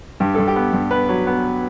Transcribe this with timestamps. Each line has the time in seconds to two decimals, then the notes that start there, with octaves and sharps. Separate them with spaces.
0.20 G2 G4
0.34 G2 A4
0.47 G4
0.56 B3
0.73 G2
0.91 B3 B4
1.09 F#3
1.27 B3